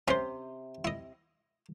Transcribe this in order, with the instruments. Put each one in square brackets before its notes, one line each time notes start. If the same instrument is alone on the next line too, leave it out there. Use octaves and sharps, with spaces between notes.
[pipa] C3 [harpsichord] C#4 C5
[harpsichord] E4 D#5